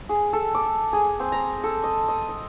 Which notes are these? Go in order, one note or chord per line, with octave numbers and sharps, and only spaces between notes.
G#4
A4
D6
G#4
C4
A#5
A4
D#5
D#5
D#5